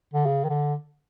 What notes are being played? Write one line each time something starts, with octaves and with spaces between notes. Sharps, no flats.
D3
C#3
D#3
D3